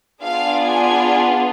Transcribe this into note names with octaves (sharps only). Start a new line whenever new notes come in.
B3 D4 F4 G#4 F5
G#5